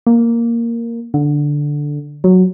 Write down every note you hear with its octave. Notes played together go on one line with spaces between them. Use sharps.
A#3
D3
F#3